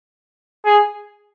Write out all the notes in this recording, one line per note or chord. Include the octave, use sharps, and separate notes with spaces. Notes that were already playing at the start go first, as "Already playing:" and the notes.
G#4